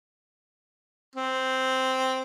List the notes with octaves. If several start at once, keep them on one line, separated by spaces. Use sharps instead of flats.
C4